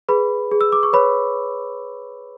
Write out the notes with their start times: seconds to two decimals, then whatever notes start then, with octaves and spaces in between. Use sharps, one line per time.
0.09 G#4 B4 B5
0.51 G#4
0.61 E6
0.72 D6
0.83 C#6
0.93 B4 C#5 B5